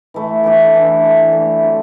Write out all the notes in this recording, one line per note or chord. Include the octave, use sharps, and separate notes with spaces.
E3 A3 E4
E3 A3 D4 G4
E3 A3 D4 G4
E3 A3 D4 G4
E3 A3 D4 G4
D3 F#3 C4